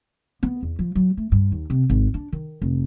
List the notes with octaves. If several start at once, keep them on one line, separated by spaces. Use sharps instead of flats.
B3
E2
F3
F#3
A3
G2
D#2
C3
G#1
D4
D#3
F1